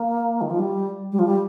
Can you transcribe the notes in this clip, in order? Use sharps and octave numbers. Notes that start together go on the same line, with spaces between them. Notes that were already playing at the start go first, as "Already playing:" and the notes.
Already playing: A#3
D#3
F3
G3
G3
F3
G3